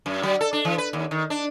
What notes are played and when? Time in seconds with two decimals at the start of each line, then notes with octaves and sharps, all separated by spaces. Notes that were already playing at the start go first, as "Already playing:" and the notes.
0.06 F#2
0.23 F#3
0.41 A4
0.53 D4
0.65 E3
0.78 B4
0.93 D#2
1.11 D#3
1.30 D4